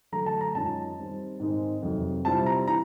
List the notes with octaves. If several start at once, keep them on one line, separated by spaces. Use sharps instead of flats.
D3 F#3 A3 A#5
A5
A#5
F#2 D#3 G#3 C#4 F4 A5
D#3 G3 C4 D#4
G#2 D#3 G#3 C4 D#4
F2 C3 D#3 F#3
C3 E3 G3 C4 F4 A5
A#5
E3 A#5